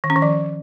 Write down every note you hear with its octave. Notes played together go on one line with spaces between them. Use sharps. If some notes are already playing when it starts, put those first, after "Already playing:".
D#3
C#4
D#3
F3